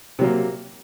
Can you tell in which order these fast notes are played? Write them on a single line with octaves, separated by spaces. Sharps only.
C3 F#3 A#3